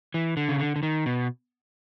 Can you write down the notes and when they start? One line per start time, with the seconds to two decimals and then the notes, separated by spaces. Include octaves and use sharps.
0.14 E3
0.37 D3
0.49 C#3
0.59 D3
0.76 D3
0.83 D#3
1.06 B2